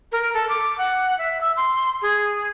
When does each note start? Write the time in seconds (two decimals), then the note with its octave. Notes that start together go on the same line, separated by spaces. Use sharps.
0.12 A#4
0.34 A4
0.49 D6
0.78 F#5
1.18 E5
1.41 E6
1.57 C6
2.02 G#4